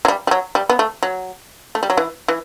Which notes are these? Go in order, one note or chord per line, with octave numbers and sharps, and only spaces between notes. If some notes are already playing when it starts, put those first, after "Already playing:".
F#3
G3
G3
F#3
G3
B3
A3
F#3
A3
G3
F#3
E3
E3